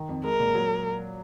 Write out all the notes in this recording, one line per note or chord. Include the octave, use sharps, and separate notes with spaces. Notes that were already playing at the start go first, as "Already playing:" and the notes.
Already playing: D#3
F2
G#3 A#4
A#2
F#3